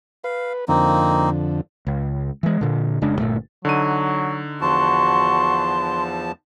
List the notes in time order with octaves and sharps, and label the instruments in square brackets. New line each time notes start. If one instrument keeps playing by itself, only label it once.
[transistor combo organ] B4 [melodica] F5
[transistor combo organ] F2 D3 [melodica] A#3 C4 D#4
[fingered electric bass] C#2
E3 G#3
A#2 D3
F1 C#3 G#3 D4
G1 D#2 A#2 A3
[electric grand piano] D3 D#4 D#7 [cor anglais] F#3
[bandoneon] E2 F3 A5 [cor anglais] F#4 [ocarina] C6